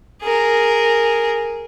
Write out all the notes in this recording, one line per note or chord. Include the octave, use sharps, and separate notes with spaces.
G#4 A#4